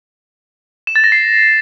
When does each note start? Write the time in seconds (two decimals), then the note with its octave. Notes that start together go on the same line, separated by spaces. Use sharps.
0.87 E7
0.96 A6
1.04 A#6
1.12 C7